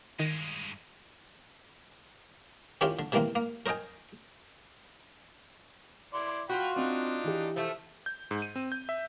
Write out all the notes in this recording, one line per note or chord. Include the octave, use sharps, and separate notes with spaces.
G2 D#3 G#3 A#6
D#3 C4 C#4 E4 F4 G4
D3
C3 D#3 E3 A#3 C4
A#3
A#4 C5 D#5 G5 G#5
E4 D5 C6
F4 F#4 G5 B5
C4 D4 D#4
E3 G4
F3 A3 E5
G6
G#2
D#7
C4
G6
E5